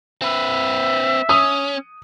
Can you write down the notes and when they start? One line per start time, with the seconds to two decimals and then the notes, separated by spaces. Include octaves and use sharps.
0.22 C4 B4 E5
1.29 C#4 D#6